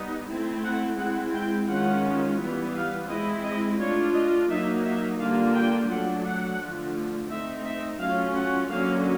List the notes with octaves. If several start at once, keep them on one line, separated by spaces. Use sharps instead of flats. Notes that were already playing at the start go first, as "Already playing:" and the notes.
Already playing: G3 B3 D#4
A3 C4 E4
F#5
G#3 C4 E4 F#5
G5
D#3 G#3 C#4 F4 F#5
E3 G3 B3
F5
G#3 C4 E4 D#5
D#5
A3 D4 F4 C#5
D#5
F#3 A#3 D#4 E5
E5
D3 G3 A#3 D4 F4 F5
G5
F#3 A3 D4 F#5
F#5
D3 F3 A3
A3 C4 D#4 E5
E5
F#3 A3 C#4 F4 F5
F#5
D3 F#3 A#3 C#4 F5